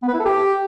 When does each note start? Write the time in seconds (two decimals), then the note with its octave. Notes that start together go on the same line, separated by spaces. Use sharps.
0.02 B3
0.08 B4
0.14 E4
0.19 A4
0.25 G4